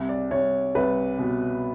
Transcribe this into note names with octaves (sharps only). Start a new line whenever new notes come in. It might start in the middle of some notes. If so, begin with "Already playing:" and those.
Already playing: C2
D5
C2 C#5
C2 B4
B2